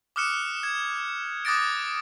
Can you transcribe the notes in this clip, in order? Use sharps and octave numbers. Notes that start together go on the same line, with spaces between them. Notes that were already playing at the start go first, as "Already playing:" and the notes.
D6 D#6 F6 F#6 C#7 E7
G#6
D6 D#6 F#6 A6 A#6 D7